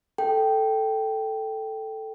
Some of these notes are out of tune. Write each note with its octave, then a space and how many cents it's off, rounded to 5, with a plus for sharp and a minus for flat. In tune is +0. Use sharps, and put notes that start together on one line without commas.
A4 +0 G5 -5